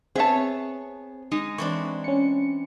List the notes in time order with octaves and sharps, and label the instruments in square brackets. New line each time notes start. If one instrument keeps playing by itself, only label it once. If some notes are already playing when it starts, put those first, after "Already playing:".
[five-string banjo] B3 E5 A5 [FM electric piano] C4 [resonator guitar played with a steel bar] G#4 C#5
[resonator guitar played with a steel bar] G#3 D#4
[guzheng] E3 C4 D4 [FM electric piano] C#6
[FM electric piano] C#4 C#7